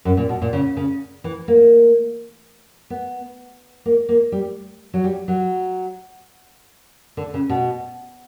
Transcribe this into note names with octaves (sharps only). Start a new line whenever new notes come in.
F#2
A#2
B2
A#2
C#3
C#3
E3
A#3
B3
A#3
A#3
G3
F#3
G3
F#3
D3
C#3
B2